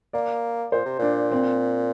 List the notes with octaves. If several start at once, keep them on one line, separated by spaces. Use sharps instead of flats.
A#3 D5
A#2 C5
C3
A#2 D4
C4